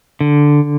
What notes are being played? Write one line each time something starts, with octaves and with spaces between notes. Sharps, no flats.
D3